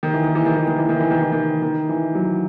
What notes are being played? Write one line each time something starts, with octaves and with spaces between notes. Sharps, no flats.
D#3
E3
D#3
E3
D#3
E3
D#3
E3
D#3
E3
D#3
E3
D#3
D#3
E3
F#3